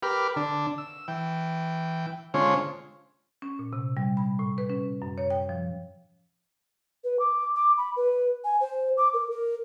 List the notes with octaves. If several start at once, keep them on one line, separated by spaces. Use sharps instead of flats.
G4 A#4 B4 B5 D6 F6
D3 D4
E6
E3 G5
D3 G#3 C#4 F4 C5 C#5
C#4
A#2
C3
G3
B5
A2
B4
C#4
F#2
C#5
G5
F3
B4
D6
D6
B5
B4
G#5
C5
D6
A#4
A#4